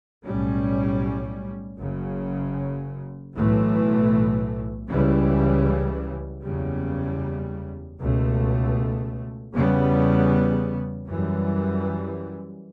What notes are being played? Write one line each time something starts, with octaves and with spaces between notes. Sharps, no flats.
B1 A2 G3 C#4
F#1 F#2 C#3
B1 A2 E3 A3
C#2 C#3 E3 G3
F#1 E2 C#3 G3
C#2 B2 A3
E2 C#3 G3 B3
F#2 E3 G3